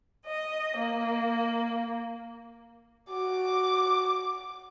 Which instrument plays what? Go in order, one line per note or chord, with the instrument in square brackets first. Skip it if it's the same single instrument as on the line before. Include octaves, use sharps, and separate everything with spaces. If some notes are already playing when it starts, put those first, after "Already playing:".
[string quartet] D#5
A#3
[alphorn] F#4 [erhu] D6